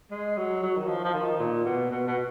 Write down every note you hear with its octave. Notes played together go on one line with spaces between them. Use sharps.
G#3
F#3
F#3
D#3
F3
F3
D#3
A#2
B2
B2
B2